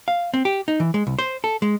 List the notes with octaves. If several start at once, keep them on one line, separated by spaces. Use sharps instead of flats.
F5
C4
G4
D#4
E3
G#3
C2
C5
A4
G#3